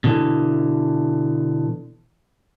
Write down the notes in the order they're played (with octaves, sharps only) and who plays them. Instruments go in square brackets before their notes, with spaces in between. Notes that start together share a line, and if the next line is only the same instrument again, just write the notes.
[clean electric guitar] B2 D3 E3